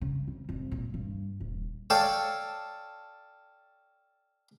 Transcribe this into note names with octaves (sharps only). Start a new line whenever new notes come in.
C#3
F1
F1
A#2
G2
D#1
A4 C#5 D5 F5 G5 A5